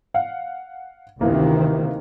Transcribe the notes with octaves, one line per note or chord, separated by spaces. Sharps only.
F5 F#5
D2 C3 D#3 E3 A#3